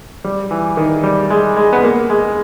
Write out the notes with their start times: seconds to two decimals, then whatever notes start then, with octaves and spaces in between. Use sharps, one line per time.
0.24 G3
0.51 E3
0.77 D#3
1.04 G3
1.30 G#3
1.57 G#3
1.73 B3
1.83 A#3
2.10 G#3